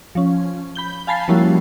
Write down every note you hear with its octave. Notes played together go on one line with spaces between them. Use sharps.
F3 C#4
B5 G6 G7
F5 G#5 A5 B5 A6 C7
F3 G3 A#3 C#4 E4 F#4